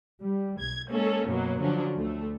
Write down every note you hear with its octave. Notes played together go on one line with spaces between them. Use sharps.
G3
B1 G#6
G#3 A#3 C#4 A4
F#2 B2 F#3 A#3
D3 F3 F#3 C#4 D4
D2 A3